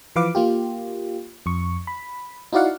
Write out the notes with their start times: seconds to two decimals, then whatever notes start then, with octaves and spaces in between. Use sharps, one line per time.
0.16 E3 F3 B4 F5 D6
0.35 A#3 F4 G4
1.46 F2 C#6
1.87 B5
2.53 D#4 E4 F#4 D5 F5 F#5